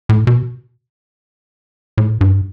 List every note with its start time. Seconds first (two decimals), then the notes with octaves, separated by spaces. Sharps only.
0.09 A2
0.27 B2
1.98 A2
2.21 G2